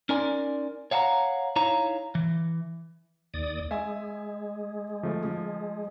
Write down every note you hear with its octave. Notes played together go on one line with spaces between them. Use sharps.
C#4 D#4 A#4 D5 G#5 C6
C#5 F5 F#5 A5 A#5
D#4 E4 C#5 F5 A#5
E3
D#2 D5 D#6
G#3 E5 G#5
F3 A3
F3